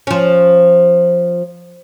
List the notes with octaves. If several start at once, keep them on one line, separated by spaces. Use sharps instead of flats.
F3 C#4